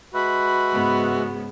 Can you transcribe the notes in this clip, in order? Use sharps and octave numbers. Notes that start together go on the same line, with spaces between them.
G#3 F#4 B4 E5 B5
G#2 C#3 B3